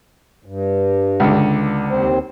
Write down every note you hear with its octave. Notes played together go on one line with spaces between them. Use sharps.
G2
C#2 D3
D#2 C4 C5